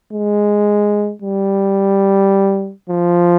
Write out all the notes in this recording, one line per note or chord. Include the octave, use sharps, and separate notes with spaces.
G#3
G3
F3